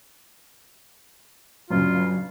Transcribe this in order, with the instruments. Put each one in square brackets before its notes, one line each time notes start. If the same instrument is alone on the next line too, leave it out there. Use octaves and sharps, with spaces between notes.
[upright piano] G1 C#3 [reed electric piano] F#3 [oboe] F4